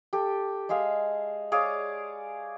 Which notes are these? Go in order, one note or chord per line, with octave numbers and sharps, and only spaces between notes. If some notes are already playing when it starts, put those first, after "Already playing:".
G4 A4
G#3 G#4 E5 F5
G#4 C#5 D5 F5